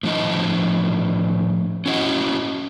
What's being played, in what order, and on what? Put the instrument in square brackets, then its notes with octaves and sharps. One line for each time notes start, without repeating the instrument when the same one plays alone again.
[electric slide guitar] A2 F3 D4 D#5
C#4 E4 F#4 D#5 F#5